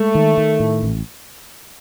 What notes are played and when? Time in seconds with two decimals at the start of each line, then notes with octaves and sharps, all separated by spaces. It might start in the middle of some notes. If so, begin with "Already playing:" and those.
Already playing: G#3 A3
0.15 D#3
0.37 D#3
0.60 A2
0.82 A1